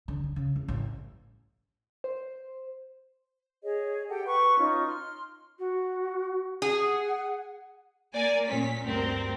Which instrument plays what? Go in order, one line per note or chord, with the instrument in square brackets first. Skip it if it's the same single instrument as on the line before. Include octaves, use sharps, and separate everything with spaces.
[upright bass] D3
D3
C#3
E2
A1
[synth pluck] C5
[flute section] G#4 C#5 D#5
G4 A4 F#5 G5
B4 C#6
C#4 D#4 F4 D#5
C6 F6
[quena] F#4
[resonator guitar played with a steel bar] G#4 [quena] F#5
[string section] A#3 A#4 D5 G#5
A#2 A3 C#4 B6
D2 G2 C4 A#4